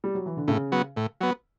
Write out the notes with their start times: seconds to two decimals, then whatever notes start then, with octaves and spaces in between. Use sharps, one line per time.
0.04 G3
0.15 F#3
0.26 E3
0.37 D3
0.48 A2 C#3
0.72 F#3 B3
0.97 A2
1.21 F#3 B3